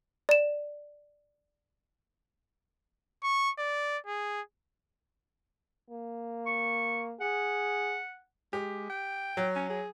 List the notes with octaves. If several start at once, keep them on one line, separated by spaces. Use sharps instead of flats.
D5 E7
C#6
D5
G#4
A#3
C#6
G#4 F#5
G#3 G4
G5
F#3
C#4
G#4